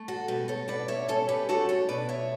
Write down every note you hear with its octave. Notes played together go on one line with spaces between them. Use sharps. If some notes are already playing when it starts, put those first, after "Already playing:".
Already playing: A3
F#4 A4
B2 G4 B4
A4 C#5
B2 B4 D5
C#5 E5
C#4 A4 C#5
G4 B4
A3 F#4 A4
A4 C#5
B2 B4 D5
C#5 E5